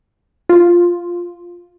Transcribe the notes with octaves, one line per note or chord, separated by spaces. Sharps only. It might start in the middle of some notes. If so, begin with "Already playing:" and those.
F4